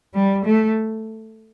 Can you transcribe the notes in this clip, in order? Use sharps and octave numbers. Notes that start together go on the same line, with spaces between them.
G3
A3